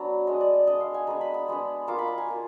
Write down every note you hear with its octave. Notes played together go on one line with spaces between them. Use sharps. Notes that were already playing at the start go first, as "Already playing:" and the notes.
Already playing: F#3 B3 D4 G#5
G#3 B3 D4 D#5
D5
D5
G#3 B3 D4 D#5
F5
G#5
G#3 B3 D4 A#5
B5
D#6
G#3 B3 D4
A#3 F4 D6
B5
A#5
G#5
A#3 F4